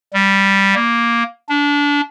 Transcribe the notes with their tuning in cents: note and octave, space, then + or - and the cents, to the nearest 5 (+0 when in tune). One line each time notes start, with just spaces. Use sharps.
G3 +0
A#3 +5
D4 -25